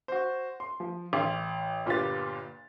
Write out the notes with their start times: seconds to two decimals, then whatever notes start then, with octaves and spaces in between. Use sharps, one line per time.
0.08 F#4 C5
0.60 C6
0.80 F3
1.13 A1 F5 C6
1.86 G1 A#2 F4 G4 B4 A6